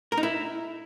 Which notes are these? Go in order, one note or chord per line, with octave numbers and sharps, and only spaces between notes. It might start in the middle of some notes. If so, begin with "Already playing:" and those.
A#4
D#4
E4